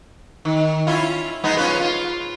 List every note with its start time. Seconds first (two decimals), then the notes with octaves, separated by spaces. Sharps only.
0.45 D#3
0.87 C#4 E4 F4
1.44 G#3 B3 D#4
1.57 C#4 F4 B4
1.80 F4